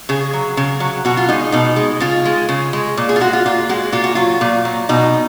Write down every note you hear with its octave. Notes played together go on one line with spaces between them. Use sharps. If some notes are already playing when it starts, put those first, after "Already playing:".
C#3 G#4
F#3
C#3
F#3
B2 F#4
F4
G#3 D#4
B2 D#4
G#3
C#3 F4
G#3
C#3
G#3
A#2
G#4
F4
G#3 F#4
F4
A#2 F4
G#3 F#4
A#2 F4
F#4
F#3 F4
A#2
F#3
B2 D#4